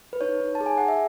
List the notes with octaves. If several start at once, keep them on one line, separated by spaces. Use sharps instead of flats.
B4
D#4 C#5
D#4
A5
G#4
G#5
G#4 F#5
E5